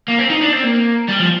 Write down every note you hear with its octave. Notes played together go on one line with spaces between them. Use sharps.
A#3
C4
D#4
D4
C4
A#3
G3
F3